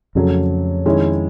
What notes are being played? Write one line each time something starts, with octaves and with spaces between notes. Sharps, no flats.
F2 C#3 F#3 A3
D#3 G#3 C#4 E4